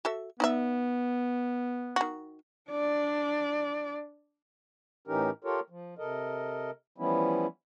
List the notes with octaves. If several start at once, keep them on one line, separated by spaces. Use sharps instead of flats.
F#4 A4 E5
B3 D#4 D5 E5
D#3 F#4
D4 D5
A2 E3 C#4 D#4 G4 A#4
F4 G4 A4 A#4 C#5
F3
C3 A4 A#4 D#5
E3 F3 G3 B3 C#4 E4